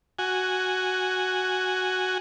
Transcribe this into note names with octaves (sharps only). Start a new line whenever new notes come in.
F#4 G#5